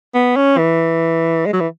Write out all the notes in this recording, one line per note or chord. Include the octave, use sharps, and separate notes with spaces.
B3
C#4
E3
G#3
F#3
E3